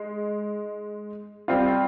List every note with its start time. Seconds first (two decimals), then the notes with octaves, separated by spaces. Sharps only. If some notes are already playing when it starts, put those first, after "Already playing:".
Already playing: G#3 D#4
1.48 G3 C4 F4